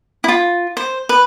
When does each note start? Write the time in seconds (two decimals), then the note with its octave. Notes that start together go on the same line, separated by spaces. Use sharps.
0.24 E4 F4
0.77 C5
1.09 B4